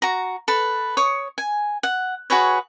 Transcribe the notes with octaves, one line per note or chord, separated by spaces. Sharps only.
F#4 A#5
A4 B4
C#5 C#6 D#6
G#5
F#5
F#4 G#4 B4 C#5